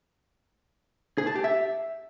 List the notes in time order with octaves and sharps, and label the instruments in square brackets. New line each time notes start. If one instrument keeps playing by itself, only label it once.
[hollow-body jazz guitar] G#4
A5
G4
E5